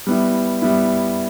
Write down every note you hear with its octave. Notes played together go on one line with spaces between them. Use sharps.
G3 B3 E4
G3 B3 E4